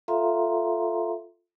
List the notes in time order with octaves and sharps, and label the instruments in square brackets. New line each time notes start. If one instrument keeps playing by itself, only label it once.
[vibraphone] F4 A4 E5 F5 A#5 C6